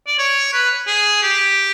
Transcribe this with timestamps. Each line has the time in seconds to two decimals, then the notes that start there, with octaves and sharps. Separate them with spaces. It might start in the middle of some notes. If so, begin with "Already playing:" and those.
0.07 D5
0.18 C#5
0.53 B4
0.87 G#4
1.23 G4